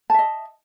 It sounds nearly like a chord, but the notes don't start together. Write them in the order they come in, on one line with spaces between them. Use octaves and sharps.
A5 E5 D#5